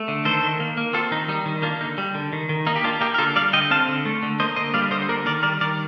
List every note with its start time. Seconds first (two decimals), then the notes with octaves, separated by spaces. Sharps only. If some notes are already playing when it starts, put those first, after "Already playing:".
Already playing: A3
0.08 D3
0.25 D#3 A4 C5
0.43 D#3
0.60 A#3
0.77 A#3
0.93 C4 F4 A4
1.11 D#3 D#4
1.28 G3 D#4
1.46 D#3
1.62 A#3 D4 F4
1.81 D3 D#4
1.98 G3
2.14 D3
2.33 D#3
2.49 D#3
2.67 A#3 D#4
2.76 G4
2.84 A#3 D4 F4
3.01 A#3 D#4 G4
3.14 A#4
3.18 D3 F4 A4
3.36 G3 D5 F5
3.53 D3 D#5 G5
3.71 C4 F5 A5
3.88 D3
4.05 A3
4.23 D3
4.40 A#3 C5 D#5
4.56 D3 C5 D#5
4.74 G3 D5 F5
4.91 D3 C5 D#5
5.02 C5
5.09 A#3 A#4 D5
5.26 D#3 A#4 D5
5.43 G3 A#4 D5
5.61 D#3 A#4 D5